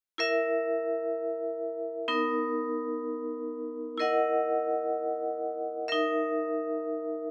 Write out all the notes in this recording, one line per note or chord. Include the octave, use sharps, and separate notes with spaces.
E4 A#4 E5
B3 D#4 A#4
E4 A#4 D#5 F#5
D#4 A#4 E5